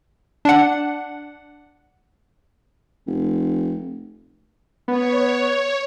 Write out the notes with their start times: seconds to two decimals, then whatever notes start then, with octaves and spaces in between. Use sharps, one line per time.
0.45 D4 F#5
3.07 F1
4.88 B3 C#5